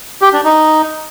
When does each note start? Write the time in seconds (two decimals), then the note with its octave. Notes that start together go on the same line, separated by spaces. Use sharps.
0.22 G4
0.33 D4
0.45 D#4